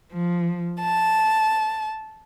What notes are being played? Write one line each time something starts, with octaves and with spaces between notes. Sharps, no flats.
F3
A5